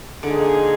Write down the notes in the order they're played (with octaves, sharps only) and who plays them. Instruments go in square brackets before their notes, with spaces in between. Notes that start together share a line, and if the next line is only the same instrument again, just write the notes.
[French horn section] A#2 G#3 D#4 G#4 [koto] D3